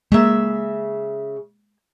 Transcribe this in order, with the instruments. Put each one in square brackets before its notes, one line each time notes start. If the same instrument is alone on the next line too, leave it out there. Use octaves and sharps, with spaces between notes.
[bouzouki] C#3 E5 [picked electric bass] G#3 A#3